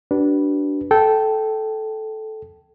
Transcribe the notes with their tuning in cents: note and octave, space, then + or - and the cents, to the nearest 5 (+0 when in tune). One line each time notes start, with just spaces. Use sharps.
D4 -10 F#4 +45 B4 -10
A4 -10 G5 -15